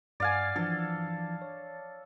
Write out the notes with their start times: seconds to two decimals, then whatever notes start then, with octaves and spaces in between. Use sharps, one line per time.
0.20 G2 D5 F5 G#5
0.56 E3 F3 D4 A4
1.42 C#5